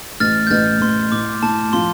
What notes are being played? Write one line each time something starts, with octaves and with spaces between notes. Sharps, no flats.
A1 F6 A6
G6
A1 F6 A6
A1 C6
A2 D6
A2 A5
F3 C6